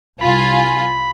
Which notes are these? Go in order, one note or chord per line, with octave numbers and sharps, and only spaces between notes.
C2 F4 G#5 B5